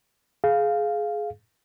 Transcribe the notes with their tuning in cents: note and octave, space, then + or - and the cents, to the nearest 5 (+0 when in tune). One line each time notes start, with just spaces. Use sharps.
G#4 +20 F5 +0